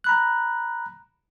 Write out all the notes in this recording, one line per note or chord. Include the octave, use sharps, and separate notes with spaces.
A#5 B5 F#6